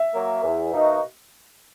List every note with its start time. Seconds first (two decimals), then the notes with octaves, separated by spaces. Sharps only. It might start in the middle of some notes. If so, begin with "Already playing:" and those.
Already playing: E5
0.14 F#3 A#3
0.43 E2
0.71 B2 A#3 D#4 F#4